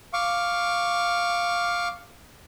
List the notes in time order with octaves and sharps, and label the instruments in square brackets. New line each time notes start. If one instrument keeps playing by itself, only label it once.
[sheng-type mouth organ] F5 C#6 D6